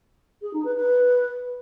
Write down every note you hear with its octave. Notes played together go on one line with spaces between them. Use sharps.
G#4
D#4
B4
B4